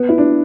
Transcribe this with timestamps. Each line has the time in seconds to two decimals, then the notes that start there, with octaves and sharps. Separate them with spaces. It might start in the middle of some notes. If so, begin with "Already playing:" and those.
Already playing: B3
0.09 E4
0.18 D4